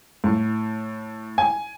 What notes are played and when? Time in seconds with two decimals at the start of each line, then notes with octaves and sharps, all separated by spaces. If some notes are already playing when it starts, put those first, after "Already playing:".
0.24 A2
1.38 G#5